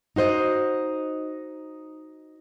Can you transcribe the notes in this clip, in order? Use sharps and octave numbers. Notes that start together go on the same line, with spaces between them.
D#4 F#4 C5 D#5